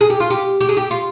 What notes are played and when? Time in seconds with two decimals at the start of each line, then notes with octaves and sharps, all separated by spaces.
0.01 G#4
0.10 G4
0.20 F4
0.30 G4
0.61 G4
0.69 G#4
0.77 G4
0.91 F4